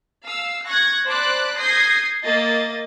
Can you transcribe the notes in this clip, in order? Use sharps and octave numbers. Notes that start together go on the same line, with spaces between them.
F5 E6
C#6 F#6 G#6 A#6
C5 D5 A5 B5 D6 F#6
D#6 G6 G#6 A#6 C7
A#3 D#5 A6